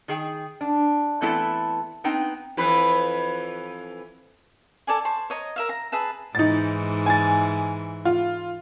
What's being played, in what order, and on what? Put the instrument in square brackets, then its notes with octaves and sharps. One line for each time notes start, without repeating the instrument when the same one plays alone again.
[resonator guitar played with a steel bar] D#3 G#4 G5
D4
E3 A3 B3 C4 E4 A4
B3 C4 D#4 G5
[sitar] F2 E3 B4
[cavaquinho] A4 D5 G#5
C5 A5 C#6
C#5 D#5 A#5
A#4 E5 F5
A#5
G#4 B4 E5 A5
[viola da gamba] G#2 E3 [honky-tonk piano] D#4 A6
[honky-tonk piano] G#5 A6
F4